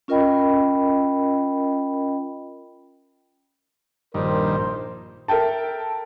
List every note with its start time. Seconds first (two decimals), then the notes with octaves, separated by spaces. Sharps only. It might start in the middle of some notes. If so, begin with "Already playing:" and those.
0.08 C#4 F4 A#4 D#5 G5 B5
4.14 A#1 G2 D#3 A#4 C5
5.28 A4 A#4 E5 G5 A5